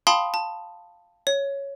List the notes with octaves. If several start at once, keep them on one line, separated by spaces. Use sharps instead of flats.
F5 G5 A5 B5 C6 D#6
A5
C#5